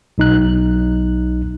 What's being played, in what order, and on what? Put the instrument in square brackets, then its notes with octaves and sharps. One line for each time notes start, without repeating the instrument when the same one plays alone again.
[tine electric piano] B1 D#4 F#6